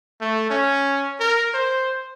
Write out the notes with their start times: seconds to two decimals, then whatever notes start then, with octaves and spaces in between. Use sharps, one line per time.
0.21 A3
0.50 C#4
1.20 A#4
1.54 C5